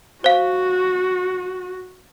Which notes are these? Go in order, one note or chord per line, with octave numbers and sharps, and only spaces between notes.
F#4 C5 F5